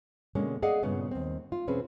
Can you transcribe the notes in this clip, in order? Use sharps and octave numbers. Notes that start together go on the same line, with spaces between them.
B2 D3 G#3 A#3 C#4
G#4 D5 D#5 F5 F#5
G2 A#2 C#3 B3 C#4
D#2 C4
F4
E2 B2 C4 C#4 G#4 B4